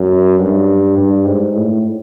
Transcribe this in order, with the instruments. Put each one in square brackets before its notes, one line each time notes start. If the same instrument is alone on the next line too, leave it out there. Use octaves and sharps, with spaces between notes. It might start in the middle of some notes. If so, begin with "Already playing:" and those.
Already playing: [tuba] F#2
G2
G2
G#2
A2